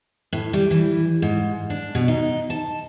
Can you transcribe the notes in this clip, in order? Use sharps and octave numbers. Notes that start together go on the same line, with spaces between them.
A2
G3
E3
G#2
D4
B2
D#4
A5